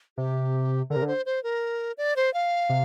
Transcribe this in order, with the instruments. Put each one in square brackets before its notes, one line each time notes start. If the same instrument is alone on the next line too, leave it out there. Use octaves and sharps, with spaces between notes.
[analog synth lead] C3 [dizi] G4
[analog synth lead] D3 [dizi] A#4
[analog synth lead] C3
D3
[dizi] C5
C5
A#4
D5
C5
F5
[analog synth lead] C3